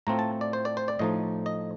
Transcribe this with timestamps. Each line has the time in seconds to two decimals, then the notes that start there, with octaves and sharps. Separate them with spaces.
0.07 A2 A3 C4 F4 A#5
0.19 A5
0.41 D5
0.53 C5
0.65 D5
0.77 C5
0.88 D5
0.99 A2 F3 A3 D#4 D#5
1.46 D#5